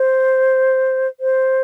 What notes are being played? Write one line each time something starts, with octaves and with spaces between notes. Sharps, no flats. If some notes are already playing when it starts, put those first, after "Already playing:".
Already playing: C5
C5